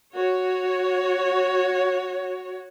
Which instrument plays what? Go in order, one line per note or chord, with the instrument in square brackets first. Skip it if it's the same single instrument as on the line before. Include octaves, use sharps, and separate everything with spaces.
[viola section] F#4 C#5